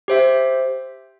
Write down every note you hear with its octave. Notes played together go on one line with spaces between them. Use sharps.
G4 C5 E5